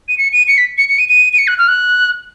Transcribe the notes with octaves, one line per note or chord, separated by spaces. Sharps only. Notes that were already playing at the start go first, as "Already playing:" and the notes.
D#7
C#7
D#7
C#7
B6
C#7
C#7
D#7
D#7
D#7
C#7
F#6
F6
F#6